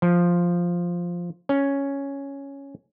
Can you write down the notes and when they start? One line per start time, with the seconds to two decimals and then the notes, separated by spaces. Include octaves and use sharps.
0.02 F3
1.49 C#4